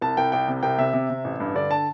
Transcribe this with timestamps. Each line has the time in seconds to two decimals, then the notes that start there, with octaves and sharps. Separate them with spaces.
0.01 C2 A5
0.17 C2 G5
0.32 C2 G5
0.48 C3
0.63 C2 G5
0.78 C3 E5
0.93 C3
1.10 C3
1.24 A1
1.40 G2
1.55 D3 D5
1.71 A5